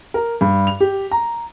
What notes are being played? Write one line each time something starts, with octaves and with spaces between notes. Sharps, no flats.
A#4
G2
F7
G4
A#5